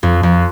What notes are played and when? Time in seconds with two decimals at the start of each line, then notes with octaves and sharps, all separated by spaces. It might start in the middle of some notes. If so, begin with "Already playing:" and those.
0.03 F2
0.23 F2